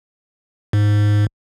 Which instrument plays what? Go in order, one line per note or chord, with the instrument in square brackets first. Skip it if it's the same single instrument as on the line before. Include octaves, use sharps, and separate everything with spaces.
[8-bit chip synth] G#2